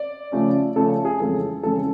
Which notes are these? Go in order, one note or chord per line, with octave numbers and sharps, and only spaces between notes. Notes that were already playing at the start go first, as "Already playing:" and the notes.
Already playing: D5
C#3 F3 A3 C#4
C#3 F3 A3 C#4 A4
G#4
F2 C#3 E3 G#3 C#4 A4
F2 C#3 E3 G#3 C#4 A4
A4